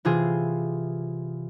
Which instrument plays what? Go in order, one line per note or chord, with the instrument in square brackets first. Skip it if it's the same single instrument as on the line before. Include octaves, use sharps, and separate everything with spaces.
[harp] C3 E3 F4 G#4 C5